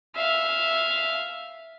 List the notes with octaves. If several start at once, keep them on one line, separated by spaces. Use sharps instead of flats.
E5 F5